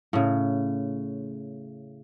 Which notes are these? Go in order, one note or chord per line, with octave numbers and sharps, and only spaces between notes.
A2 C#3